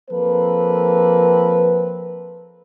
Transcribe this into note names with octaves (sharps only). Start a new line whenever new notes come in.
F3 A#3 C4 A4 B4